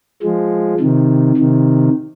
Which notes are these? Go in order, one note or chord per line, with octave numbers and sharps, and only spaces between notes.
F3 G#3
C3 D#3
C3 D#3